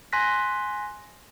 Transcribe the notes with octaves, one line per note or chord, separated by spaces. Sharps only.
G#5 C6 F#6 A#6 B6